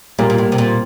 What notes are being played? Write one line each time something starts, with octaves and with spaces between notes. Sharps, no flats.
A#2 G3 A#3
A#2
A2
C3
A#2